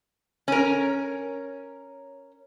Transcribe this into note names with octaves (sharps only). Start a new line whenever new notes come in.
C#4 A#4